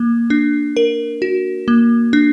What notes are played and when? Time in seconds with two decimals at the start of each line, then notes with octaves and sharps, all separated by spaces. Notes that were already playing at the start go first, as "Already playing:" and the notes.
Already playing: A#3
0.30 D4
0.77 A#4
1.22 F#4
1.68 A#3
2.13 D4